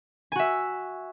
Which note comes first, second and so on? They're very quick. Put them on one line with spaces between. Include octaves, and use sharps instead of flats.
G#5 F#4 E5